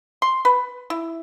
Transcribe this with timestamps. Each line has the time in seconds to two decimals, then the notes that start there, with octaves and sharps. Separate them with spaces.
0.22 C6
0.45 B4
0.90 E4